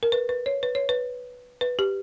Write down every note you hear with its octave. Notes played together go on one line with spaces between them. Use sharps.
A#4
B4
B4
C#5
B4
C#5
B4
B4
G4